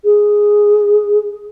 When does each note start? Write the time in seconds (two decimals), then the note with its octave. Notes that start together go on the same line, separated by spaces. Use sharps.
0.05 G#4